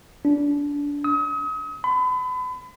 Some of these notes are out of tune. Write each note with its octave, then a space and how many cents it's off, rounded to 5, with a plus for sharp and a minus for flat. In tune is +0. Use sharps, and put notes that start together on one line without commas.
D4 -25
D#6 +40
B5 +35